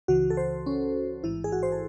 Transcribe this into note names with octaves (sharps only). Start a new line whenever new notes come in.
C#2 C#3 E3 F#4
A4
C5
C#4
A1 G#2 E3 E4
G#4
F#4
C5
A4